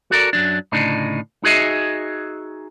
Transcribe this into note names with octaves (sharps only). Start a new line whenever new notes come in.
F#4 A4 A#4 D5
F#2 F#3 D4
D2 A2 C#3 D4 D#4
D#4 F#4 G#4 D#5 E5